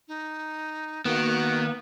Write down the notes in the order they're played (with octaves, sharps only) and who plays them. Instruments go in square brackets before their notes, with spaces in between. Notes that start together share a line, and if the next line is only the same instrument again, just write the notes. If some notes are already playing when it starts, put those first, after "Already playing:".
[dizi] D#4
[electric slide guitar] D#3 [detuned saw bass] A#3 [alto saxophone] B3 [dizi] F#4